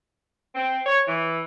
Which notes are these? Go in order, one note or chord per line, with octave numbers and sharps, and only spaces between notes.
C4
C#5
E3